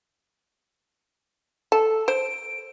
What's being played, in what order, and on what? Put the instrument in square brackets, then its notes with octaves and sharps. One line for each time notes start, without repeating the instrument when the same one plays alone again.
[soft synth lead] A4 [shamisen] A5
[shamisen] C5 [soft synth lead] D7